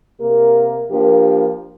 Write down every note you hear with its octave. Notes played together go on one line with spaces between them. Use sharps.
C3 A#3 G4 A#4
F3 A#3 D4 G4 A#4